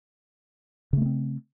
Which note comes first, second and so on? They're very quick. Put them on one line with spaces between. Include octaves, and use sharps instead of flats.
C#3 A3 A#3 C4